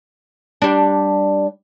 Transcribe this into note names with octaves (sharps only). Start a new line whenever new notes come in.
G3 D4